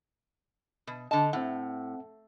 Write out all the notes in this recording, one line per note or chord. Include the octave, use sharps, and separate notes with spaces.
B2
D3 D#5 A5
A2 C4 F#5